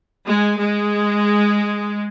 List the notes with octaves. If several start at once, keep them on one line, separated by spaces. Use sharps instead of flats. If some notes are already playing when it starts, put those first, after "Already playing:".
G#3
G#3